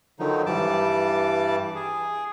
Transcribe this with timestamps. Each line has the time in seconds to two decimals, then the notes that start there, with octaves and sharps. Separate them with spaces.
0.19 D3 D#3 F3 F#3 D#4
0.46 G2 E3 G3 A5 D6
1.75 G#4